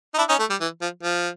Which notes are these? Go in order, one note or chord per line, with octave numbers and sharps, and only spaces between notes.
D#4
D4 E4
C#4 D#4
A3
G3
E3
F3
F3